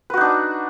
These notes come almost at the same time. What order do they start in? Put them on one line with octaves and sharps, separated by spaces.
B4 F#4 D#4 D4